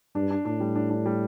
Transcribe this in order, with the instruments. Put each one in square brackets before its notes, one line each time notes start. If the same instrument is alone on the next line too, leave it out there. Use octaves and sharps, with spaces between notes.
[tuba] G2 [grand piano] D4
[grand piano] D4
[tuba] A2 [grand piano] D4
[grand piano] G3
D4
D4
G3